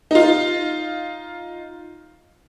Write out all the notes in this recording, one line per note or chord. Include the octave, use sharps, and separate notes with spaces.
D#4 F4